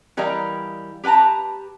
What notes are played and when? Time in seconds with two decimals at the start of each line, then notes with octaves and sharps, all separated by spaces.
0.17 E3 G3 A#4 D#5 F5 A#5
1.04 G4 B4 G5 A5 A#5